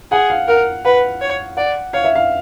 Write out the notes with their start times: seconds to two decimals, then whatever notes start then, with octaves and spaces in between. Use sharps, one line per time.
0.12 G#4 F#5
0.30 F5
0.48 A#4 F#5
0.85 B4 F#5
1.21 C#5
1.57 D5 F#5
1.93 C#5 F5
2.04 E5
2.15 F5